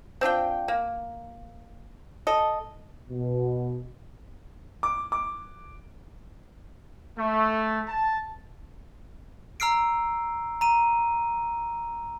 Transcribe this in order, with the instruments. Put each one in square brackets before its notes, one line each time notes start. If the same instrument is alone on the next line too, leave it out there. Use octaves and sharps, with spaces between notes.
[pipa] C4 D4 F4 G5
A#3
A4 D#5
[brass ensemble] B2
[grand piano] D6
D6
[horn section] A3
A5
[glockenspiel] A#5 E6 F6 C7 D7
A#5 D#7